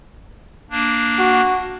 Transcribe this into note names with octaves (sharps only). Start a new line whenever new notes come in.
A#3 D4
F#4